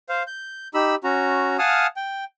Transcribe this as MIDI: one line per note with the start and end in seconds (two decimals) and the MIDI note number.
0.09 0.23 72
0.09 0.23 77
0.27 0.68 91
0.74 0.95 63
0.74 0.95 67
0.74 0.95 83
0.74 0.95 88
1.04 1.57 61
1.04 1.57 66
1.04 1.57 82
1.59 1.87 77
1.59 1.87 78
1.59 1.87 80
1.59 1.87 81
1.59 1.87 87
1.59 1.87 89
1.96 2.24 79